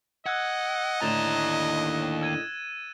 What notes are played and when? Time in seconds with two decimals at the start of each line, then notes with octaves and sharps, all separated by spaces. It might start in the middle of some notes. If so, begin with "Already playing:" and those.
0.26 D#5 F#5 E6 F#6 G#6
1.02 D#2 A2 D3 A#5 A6 E7
2.22 E6 G#6 D#7